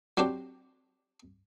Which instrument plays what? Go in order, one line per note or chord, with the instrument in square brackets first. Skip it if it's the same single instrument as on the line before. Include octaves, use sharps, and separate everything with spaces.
[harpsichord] F#3 C4 D4 G4